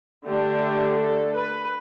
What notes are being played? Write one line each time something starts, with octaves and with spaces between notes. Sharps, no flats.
D3 A3 D4 G4
A4
B4